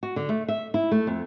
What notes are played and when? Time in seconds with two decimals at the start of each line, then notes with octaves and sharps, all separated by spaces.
0.03 F#4
0.16 D3
0.29 A3
0.48 E5
0.74 E4
0.92 A3
1.07 F2